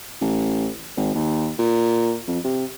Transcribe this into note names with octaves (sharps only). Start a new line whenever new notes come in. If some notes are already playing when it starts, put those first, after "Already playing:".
A1
G#1
D#2
A#2
F2
C3